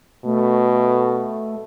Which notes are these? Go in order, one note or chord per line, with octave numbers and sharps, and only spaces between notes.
B2 A3